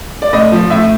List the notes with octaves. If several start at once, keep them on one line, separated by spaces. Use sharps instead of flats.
D5
A2 D#5
F3
A2 E5